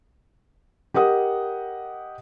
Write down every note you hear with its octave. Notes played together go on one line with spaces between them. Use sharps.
G4 A#4 D#5 F#5 D#6